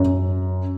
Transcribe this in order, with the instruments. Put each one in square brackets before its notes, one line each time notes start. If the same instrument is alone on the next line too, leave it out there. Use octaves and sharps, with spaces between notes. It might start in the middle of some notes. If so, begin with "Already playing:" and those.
Already playing: [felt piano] F#2